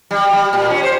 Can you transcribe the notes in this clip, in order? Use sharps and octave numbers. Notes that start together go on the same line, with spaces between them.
G3
G3
A#2
C#4
C5